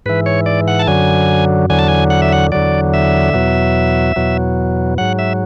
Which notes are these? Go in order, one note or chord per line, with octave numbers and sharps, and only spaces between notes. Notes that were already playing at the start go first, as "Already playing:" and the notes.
G#2 E3 B4
C#5
D5
F#5
A5
F#2 D3 F#3 G#5
E2 D3 F#3 G#5
A5
G#5
F#5
E5
F#5
E2 D3 F#3 D5
E5
E2 B2 F#3
E2 B2 F#3
G#2 F#3 F#5
E5